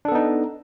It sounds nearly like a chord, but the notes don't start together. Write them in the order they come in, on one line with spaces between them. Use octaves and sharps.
D4 A4 B3 D#4